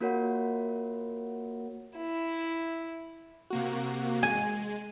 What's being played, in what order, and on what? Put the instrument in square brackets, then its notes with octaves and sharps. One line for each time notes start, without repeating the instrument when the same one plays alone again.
[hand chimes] A#3 F4 F#4 A#4 C#5 F#5
[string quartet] E4
[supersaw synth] C3 A#3 F#4
[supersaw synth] G#3 [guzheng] G#5